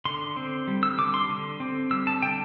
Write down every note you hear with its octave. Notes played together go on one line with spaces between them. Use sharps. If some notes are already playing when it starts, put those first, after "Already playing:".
D3 C6
C4
G3
E6
D3 D6
C6
D3
C4
G3 E6
A5
D3 G5